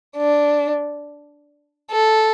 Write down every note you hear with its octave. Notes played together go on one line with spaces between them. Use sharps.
D4
A4